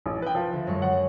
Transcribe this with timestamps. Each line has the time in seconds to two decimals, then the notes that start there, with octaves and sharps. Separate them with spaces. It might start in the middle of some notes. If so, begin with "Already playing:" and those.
0.06 A1
0.22 B4 G5
0.35 F3
0.53 D2
0.67 F#2 G#3 C#6
0.82 F#5